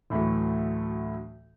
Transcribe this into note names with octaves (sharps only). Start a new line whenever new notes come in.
D2 A2 E3 F#3 A3